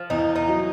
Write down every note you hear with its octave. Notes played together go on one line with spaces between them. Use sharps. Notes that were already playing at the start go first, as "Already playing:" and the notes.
Already playing: F3
E2 E3 D#4
D#4
F#3